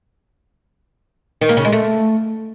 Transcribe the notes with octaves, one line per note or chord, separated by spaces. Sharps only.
D#3
A#3
C#3
G#3
A3